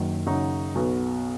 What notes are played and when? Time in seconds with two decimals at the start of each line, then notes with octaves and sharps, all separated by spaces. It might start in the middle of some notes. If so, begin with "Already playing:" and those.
Already playing: F#1 F#2 D#3 F#3
0.26 F#2 C#3 F#3 D#4 F#4
0.75 B1 B2 B3 F#4